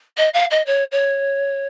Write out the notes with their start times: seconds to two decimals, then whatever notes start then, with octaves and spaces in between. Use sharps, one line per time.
0.17 D#5
0.33 F5
0.50 D#5
0.66 C#5
0.91 C#5